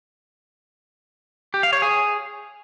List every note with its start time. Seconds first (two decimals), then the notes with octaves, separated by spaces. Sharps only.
1.54 G4
1.63 F5
1.73 C#5
1.82 G#4